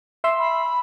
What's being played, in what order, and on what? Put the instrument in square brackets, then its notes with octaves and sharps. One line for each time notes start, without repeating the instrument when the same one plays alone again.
[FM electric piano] E5 C6 E6
[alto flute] B5